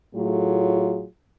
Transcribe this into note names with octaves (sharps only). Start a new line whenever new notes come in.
A2 F#3 A3 F4 G#4